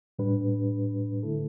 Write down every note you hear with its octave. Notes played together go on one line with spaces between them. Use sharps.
A2 G3 D4 G4 B4
D3 A3 E4 A4